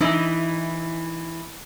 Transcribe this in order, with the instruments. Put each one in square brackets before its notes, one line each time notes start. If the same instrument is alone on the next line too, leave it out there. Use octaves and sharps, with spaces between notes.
[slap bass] E3 [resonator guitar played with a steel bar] D#4 E4